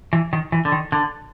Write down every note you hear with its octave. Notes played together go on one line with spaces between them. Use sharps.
E3
D#3
E3
D3
D#3
D3